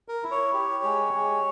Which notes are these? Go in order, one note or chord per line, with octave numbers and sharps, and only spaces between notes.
A#4
E4
C#5
G4
G#3
G#3